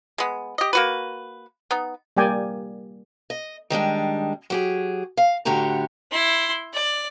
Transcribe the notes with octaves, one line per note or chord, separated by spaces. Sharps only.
G#3 B3
G4 D#5
A#3 F#4 B4
B3 D#4
G3 A#3 D5 G5 G#5
D#5
D#3 G3 G#3 D4
F#3 G4 G#4
F5
A2 D3 F#4 G4 A#5
E4 C6
D5